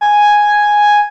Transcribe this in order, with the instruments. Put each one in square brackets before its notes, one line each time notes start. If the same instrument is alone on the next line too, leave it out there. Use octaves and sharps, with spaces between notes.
[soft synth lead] G#5